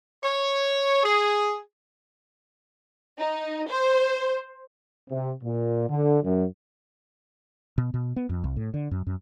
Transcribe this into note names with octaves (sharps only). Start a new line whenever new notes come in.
C#5
G#4
D#4
C5
C3
A#2
D3
F#2
B2
B2
B3
F2
C2
A2
D3
F#2
F#2